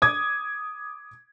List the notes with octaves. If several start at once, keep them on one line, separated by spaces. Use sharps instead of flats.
D6 D#6 G#6